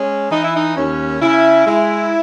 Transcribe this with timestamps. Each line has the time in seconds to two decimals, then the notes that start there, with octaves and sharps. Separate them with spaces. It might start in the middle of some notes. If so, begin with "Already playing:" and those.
Already playing: G#3 C#4
0.30 E3 D#4
0.43 E4
0.56 D#4
0.76 D#2 C#4
1.21 C#3 E4
1.66 G#3 E4